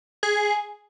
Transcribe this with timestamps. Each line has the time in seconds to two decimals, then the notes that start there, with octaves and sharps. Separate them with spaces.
0.23 G#4